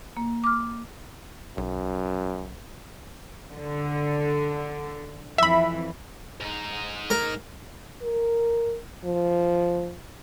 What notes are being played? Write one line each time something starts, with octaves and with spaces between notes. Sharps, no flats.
A#3
D6 F6
B1 F#2
D3
F2 E3 E5 B5
G#2 D#4
A#4
A#4
F3